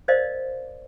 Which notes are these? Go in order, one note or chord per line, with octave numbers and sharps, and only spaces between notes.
A#4 C5 D5 D#5 F5